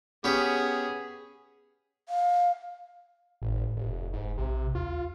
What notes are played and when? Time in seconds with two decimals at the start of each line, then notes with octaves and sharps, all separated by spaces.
0.24 B3 C#4 G4 G#4
2.09 F5
3.42 G#1 A2
3.77 F1
4.13 F1 G#2
4.38 A#1 C3
4.75 D#2 F4